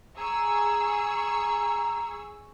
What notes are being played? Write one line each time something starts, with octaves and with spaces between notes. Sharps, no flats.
G#4 A#5 C#6 E6